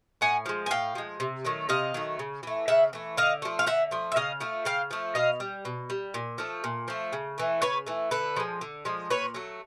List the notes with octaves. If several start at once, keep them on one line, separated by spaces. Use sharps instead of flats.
A2 F#5 G#5
F3 G#3
G#5
A2 F5 G5
F3 G#3
C3
D#3 F#3 A3
C3 D#5 F5
D#3 F#3 A3
C#3
E3 A3
C#3 E5 F#5
E3 A3
D3 D#5 F5
F3 A3
F5
D3 E5 F#5
F3 A3
E5
C#3 D#5 F5
F3 A3
C#3 F5 G5
F3 A3
B2 D#5 F5
G3
B2
G3
A#2
F3 A3
A#2
F3 A3
C#3
E3 A3
C#3 B4 C#5
E3 A3
D3 A4 B4
F3 G#3
D3
F3 G#3
A#2 B4 C#5
F#3 A3